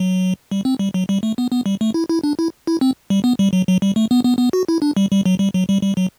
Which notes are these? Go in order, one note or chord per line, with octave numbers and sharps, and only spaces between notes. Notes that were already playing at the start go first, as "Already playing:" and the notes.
Already playing: F#3
G3
C4
G3
F#3
G3
A3
B3
B3
G3
A3
E4
E4
D4
E4
E4
C4
G3
B3
G3
F#3
F#3
G3
A3
B3
B3
B3
F#4
E4
D4
G3
G3
F#3
G3
F#3
G3
G3
F#3